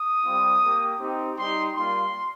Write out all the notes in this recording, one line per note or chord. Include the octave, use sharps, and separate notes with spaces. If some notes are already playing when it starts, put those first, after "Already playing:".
Already playing: D#6
G3 C4 F4
A#3 G4
C4 D#4 G4
G3 D#4 G4 C6
G3 A#3 F4 C6